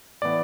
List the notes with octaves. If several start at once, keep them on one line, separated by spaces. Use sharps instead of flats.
A2 E3 B3 D5